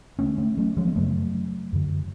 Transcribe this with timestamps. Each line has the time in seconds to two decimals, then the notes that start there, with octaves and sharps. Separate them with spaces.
0.19 D2 D3 A3 C#4
0.38 A3 C#4
0.57 F#3 A3
0.77 F3 G#3
0.87 B3
0.96 F#2 C#3 F#3 A3
1.73 F#2 D3